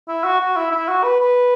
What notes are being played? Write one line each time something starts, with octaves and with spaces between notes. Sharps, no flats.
E4
F#4
F#4
E4
E4
F#4
B4
B4